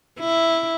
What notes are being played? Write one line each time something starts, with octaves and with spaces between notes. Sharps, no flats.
E4